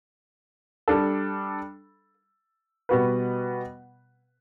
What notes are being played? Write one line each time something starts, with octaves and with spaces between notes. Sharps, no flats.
G3 D4 A4
B2 G3 B3 F#4 B4